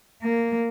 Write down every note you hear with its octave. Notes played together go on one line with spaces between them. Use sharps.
A#3